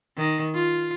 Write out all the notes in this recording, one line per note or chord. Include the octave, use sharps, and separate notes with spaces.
D#3
F4